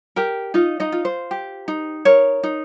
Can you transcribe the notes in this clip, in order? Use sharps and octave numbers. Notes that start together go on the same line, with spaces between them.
G4 A#4 G5
D#4 F4 D#5
D#4 D#5
F4
C5
G4
D#4
A#4 C#5
D#4